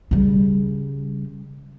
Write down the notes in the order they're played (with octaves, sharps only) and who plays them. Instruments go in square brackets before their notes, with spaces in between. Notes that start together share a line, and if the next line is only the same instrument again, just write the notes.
[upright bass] C#3 G3